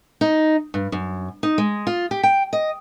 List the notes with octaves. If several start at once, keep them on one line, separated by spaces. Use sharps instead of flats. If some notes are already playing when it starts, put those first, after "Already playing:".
D#4
G2
F#2
D#4
G#3
F4
G4
G5
D#5